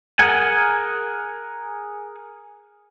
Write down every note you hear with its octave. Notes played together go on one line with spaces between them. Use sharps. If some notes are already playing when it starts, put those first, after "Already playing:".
G#4 A#4 F#5 G#5